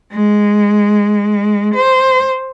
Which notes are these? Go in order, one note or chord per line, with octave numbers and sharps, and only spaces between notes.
G#3
C5